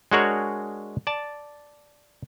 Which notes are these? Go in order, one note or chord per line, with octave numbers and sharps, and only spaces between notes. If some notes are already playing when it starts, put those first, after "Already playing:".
G#3 D4 F#4 G#4 A#4 C#5
D5 A5